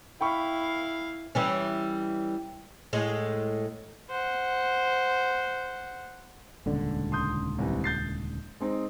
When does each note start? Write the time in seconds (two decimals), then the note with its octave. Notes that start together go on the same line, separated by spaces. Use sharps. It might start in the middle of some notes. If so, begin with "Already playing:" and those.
0.21 E4 F5 G5 B5 C#6
1.35 E3 G3 C#4
2.93 A2 G#3
4.10 C5 F#5
6.66 D#1 C#2 D3
7.12 C6 D#6 G6
7.58 C2 C3 E3
7.84 G6 A6 C7
8.60 G#3 C4 D#4